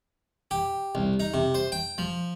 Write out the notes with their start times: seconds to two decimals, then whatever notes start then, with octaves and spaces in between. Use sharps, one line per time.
0.51 G4
0.95 C2
1.20 D#4
1.34 C3
1.55 C5
1.72 G5
1.98 F3